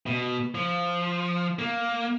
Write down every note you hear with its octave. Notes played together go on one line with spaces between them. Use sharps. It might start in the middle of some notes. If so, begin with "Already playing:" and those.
B2
F3
A#3